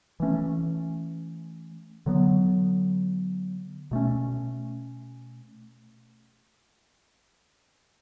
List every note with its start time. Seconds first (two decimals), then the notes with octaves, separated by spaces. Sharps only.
0.20 E3 A3 C#4
2.06 D3 F#3 B3
3.91 B2 A3 C#4